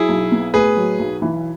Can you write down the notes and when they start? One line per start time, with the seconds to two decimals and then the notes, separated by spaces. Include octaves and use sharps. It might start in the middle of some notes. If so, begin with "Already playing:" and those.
Already playing: F#3 E4 G#4
0.09 B1
0.32 B3
0.54 A2 G#4 B4
0.76 F#3
0.99 B1
1.22 E3